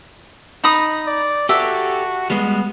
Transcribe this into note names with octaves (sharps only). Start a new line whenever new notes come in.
D#4 B5 D#6
D5
F#4 G4 A4 E5
G3 G#3 B3